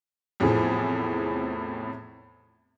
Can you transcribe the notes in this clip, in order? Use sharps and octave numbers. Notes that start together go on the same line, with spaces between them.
E2 A2 C3 F3 G#4